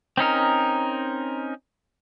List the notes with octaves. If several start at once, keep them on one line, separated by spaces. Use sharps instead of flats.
C4 C#4 D#4 A#4